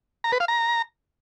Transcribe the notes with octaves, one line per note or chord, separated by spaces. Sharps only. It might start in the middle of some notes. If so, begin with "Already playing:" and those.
A#5
B4
F5
A#5